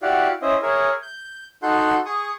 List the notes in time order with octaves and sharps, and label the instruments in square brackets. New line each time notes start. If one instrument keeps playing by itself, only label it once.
[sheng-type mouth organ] E4 F#4 G4 D5 F5 F#5
C#4 E4 C5 D#5 E5
G#4 A#4 C#5 E5
G6
D#4 F#4 A4 F#5 C6 G6
G#4 C#6 D#6